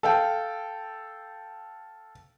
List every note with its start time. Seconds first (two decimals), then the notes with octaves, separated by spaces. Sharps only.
0.03 A4 F5 G5